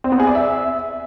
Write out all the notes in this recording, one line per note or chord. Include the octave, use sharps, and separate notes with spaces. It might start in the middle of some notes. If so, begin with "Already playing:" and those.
C4
B3
G#4
D5
E5